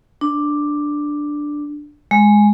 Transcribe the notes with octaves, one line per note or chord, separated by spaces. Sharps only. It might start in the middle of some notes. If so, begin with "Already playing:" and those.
D4
G#3